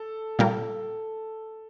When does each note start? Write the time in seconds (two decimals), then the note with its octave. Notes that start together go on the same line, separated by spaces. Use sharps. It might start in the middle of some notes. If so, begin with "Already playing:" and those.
Already playing: A4
0.39 A#2 G3 A#3